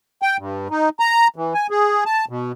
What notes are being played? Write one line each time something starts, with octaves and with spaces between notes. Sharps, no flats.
G5
G2
D#4
A#5
E3
G#5
G#4
A5
B2